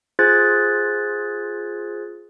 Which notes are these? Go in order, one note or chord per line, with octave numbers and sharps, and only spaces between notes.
F4 G#4 C5 F#6 G#6 A6